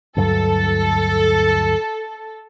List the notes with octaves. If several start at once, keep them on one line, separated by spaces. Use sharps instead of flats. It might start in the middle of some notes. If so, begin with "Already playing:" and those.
D2 G2 F#3 A4